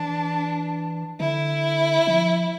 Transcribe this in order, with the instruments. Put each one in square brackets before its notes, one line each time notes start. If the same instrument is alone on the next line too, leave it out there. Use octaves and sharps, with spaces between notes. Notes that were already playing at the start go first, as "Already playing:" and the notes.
Already playing: [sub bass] E3 [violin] D4
[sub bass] D3 [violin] E4
[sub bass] F3